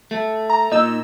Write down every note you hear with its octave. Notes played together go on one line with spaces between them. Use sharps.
A3
A#5
A#2 D#4 E6